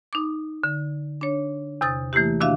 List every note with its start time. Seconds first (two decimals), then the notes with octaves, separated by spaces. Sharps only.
0.13 D#4 D6
0.64 D3
1.21 D4 C#5
1.81 E2 C3 D#6 A6
2.13 E3 A3 A#3 E4 G4
2.40 C3 D#3 D4 F#4 E5 F5